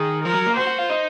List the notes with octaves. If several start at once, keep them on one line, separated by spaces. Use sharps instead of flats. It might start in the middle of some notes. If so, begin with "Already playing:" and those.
Already playing: D#3 G#4
F3 A#4
F#3
A#3
F#4 C5
F#4
F4
D#4